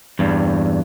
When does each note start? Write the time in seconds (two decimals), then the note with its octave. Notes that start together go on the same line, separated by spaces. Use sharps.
0.19 E2 G2